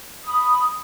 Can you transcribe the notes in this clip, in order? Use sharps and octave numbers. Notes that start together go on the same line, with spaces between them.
B5 D#6